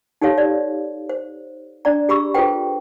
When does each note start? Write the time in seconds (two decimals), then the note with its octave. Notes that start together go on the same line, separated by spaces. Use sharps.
0.21 D#4 G4 A4 C#5 F5
0.38 D5
1.09 C5
1.85 D4 D5 A#5
2.09 G4 G#4 B5 C#6 E6
2.34 F4 G#4 A4 B4 C5 G5